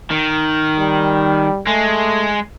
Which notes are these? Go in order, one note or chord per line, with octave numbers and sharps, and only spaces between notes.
D#3
G3
G#3 A3